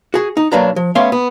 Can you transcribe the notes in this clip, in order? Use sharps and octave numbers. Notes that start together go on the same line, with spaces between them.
F#4 G#4
D#4
B1 F#3 A#3 D4 B4 A#5
F3
A3 B3 C#4 E5 F5 C6
B3